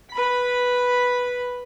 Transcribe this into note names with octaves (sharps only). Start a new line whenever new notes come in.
B4 B5